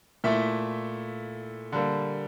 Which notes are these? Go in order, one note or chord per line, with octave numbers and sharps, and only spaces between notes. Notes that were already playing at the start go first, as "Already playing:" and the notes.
A#2 A3 E4 E5
D3 G3 A#3